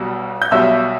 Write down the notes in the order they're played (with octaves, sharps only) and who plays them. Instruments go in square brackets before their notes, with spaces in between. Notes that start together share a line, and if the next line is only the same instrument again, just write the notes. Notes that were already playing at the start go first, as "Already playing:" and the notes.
Already playing: [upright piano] B1 B2 G3
G6
B1 B2 G3 E5 E6